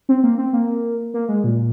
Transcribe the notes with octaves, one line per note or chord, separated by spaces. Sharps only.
C4
A#3
C4
A#3
A#3
G#3
A#2